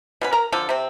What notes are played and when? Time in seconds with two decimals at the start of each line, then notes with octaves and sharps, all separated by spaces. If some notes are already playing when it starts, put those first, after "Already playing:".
0.21 B2 C#4 B4
0.33 A#4 A#5
0.52 D3 F3 A4
0.69 C3 C4